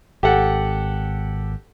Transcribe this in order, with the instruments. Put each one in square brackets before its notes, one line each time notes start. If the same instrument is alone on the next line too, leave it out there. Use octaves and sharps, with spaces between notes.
[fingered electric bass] G#1 [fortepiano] G4 A4 F#5